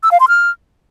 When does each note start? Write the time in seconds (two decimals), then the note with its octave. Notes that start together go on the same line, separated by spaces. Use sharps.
0.03 E6
0.11 F5
0.20 C6
0.28 F6